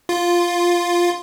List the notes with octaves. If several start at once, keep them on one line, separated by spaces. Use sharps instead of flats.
F4